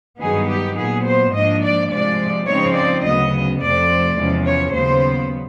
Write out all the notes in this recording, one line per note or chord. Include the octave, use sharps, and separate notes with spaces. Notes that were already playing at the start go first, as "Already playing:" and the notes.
G2 D#3 F#3 B3 D#4 G#4
G4
A#2 F#3 B3 G#4
C5
G#2 F3 A#3 D4 D#5
D5
C3 F3 G#3 D5
C#3 F3 G#3 C4 D#4 C#5
D5
D2 C#3 F#3 B3 D#5
F2 C3 F3 A3 C4 D5
E2 C3 F3 G#3 C#4
C#5
D#2 C#3 F#3 B3 C5